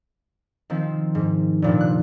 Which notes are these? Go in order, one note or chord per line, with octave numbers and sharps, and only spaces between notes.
D#3 F3 C4
G#2
G2 A#2 F3
F#6